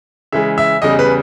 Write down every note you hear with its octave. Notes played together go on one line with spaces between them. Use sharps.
C#3 E3 G#3 E5
E5
E2 C#3 G3 D#5
B4